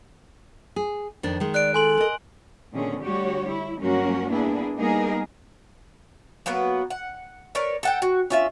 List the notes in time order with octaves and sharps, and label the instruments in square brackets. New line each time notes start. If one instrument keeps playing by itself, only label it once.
[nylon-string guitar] G#4
F2 D#3 D4
D#3 G#3
[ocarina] D5 [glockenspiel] F#6 D7
[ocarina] A4 [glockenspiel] G#5 C6 F#7
[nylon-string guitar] A#4 D#5
[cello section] A#2 D3 D#3 C4 C#4 G#4
D2 G3 F#4 G4 C#5
E4
G2 F#3 A#3 C#4 F#4 A#4
A#3 B3 D4 E4 G#4
G3 A#3 B3 D#4 G#4 A#4
[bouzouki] F#3 A#3 B3 B4
F#5
A#4 B4 C#5 D5
A4 F#5 G5
F#4
C#4 F4 E5